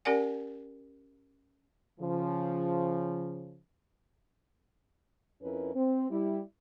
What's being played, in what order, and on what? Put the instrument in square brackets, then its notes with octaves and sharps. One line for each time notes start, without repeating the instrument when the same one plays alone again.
[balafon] C#4 G4 A#4 D5 F#5 G#5
[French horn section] C#3 F3
F2 C#4 E4 A#4 B4
C4
G3 E4